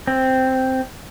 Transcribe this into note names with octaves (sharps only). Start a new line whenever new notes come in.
C4